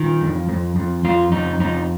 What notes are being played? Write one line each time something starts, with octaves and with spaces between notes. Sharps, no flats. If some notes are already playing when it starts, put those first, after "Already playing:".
Already playing: D#3 F4
F2
F2
F2
F2 F4
F2 D#4
F2 D#4